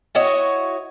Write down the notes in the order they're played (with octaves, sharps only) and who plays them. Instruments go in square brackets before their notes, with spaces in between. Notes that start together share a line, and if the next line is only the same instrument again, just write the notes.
[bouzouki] E4 F#4 C#5 D#5